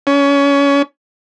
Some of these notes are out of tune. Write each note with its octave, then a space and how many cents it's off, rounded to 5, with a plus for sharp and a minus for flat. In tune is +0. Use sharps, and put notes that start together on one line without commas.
C#4 +25